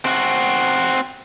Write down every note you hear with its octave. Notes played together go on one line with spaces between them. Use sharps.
C4 F#4